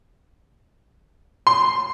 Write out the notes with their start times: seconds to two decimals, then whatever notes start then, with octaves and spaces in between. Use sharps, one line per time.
1.47 C6